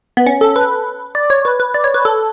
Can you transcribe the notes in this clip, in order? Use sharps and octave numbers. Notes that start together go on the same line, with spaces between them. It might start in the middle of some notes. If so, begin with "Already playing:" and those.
B3
C#4
A4
B4
D5
C#5
B4
B4
D5
C#5
B4
A4